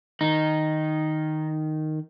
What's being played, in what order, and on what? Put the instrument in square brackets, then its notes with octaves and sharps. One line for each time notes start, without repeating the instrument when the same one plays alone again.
[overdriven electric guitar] D#3 [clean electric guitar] D#4